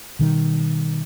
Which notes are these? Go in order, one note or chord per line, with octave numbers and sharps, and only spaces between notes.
B2 D#3 G3